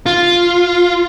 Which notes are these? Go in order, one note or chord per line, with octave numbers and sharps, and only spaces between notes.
F4